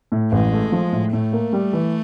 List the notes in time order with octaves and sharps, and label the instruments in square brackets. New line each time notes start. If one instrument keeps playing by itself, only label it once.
[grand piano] A2
[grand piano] A1 [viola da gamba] G#3
[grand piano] A3
F3
A2
[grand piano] A2 [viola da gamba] A3
[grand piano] A#3
G3
E3